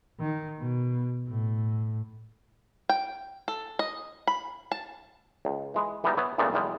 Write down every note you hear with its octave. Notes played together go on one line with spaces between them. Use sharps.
D#3
B2
A2
G5
A4
D#5
B5
A5
C#2
E3 G#3 B4
E3 G3 B3 D#4
B3 C#5 E5
G2 A#2 C#3 A3 B3 C4
B1 E2 G3 G#3